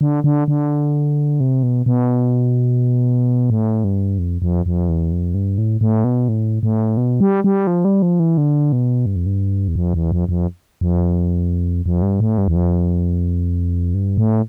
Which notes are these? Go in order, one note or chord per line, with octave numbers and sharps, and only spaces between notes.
D3
D3
D3
C3
B2
B2
A2
G2
F2
F2
F2
E2
F2
G2
A2
A2
B2
A2
A2
B2
G3
G3
F3
G3
F3
E3
D3
B2
G2
F2
G2
E2
F2
E2
F2
F2
F2
F2
G2
A2
G2
E2
F2
G2
A2